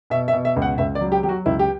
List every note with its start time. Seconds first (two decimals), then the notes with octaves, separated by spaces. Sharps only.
0.10 B2 E5
0.28 E5
0.33 B2
0.45 E5
0.56 C#2
0.62 F#5
0.78 C#2 E5
0.95 D5
1.01 F#3
1.12 G4
1.23 F#3 G4
1.29 F#4
1.46 C#2 E4
1.59 G4